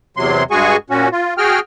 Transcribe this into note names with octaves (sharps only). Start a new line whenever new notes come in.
E2 C3 F#3 C6
G2 G#3 F#4 G#4 G#5 C#6
A#2 C#4 F#4
F4
F#4 G#4 G5 F6